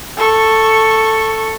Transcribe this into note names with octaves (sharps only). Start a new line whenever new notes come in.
A4 C#6